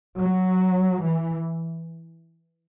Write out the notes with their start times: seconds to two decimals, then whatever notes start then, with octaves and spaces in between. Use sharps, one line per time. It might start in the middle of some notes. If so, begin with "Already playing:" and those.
0.17 F#3
1.03 E3